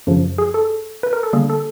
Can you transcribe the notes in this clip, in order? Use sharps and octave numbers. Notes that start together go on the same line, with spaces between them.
F#2 C#3 F3
G#4
A4
B4
A#4
A4
D3 G3 A#3 G#4
A4